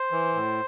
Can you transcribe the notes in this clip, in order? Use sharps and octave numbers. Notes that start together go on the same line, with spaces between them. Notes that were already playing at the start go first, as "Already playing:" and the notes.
Already playing: C5
E3
A2